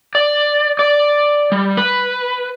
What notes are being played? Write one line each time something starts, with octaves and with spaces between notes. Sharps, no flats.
D5
D5
G3
B4